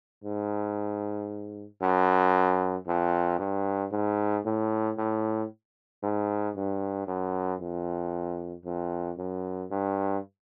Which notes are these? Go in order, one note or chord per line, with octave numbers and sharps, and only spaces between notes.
G#2
F#2
F2
G2
G#2
A2
A2
G#2
G2
F#2
F2
F2
F#2
G2